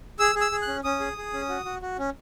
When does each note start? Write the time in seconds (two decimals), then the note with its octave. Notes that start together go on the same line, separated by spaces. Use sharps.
0.19 G#4 E6
0.35 G#4
0.41 E6
0.52 G#4
0.62 F#6
0.68 C#4
0.84 C#4 D#6
1.00 G#4
1.17 G#4
1.33 C#4
1.49 F#4
1.65 F#4
1.82 F#4
1.99 C#4